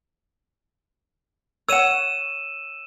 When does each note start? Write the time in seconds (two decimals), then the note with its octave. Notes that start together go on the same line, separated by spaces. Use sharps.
1.69 C#5 F#5 E6 D#7 E7